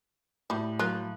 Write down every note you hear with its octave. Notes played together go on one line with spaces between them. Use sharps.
A2 G3
F#3 A#3 F4 F#6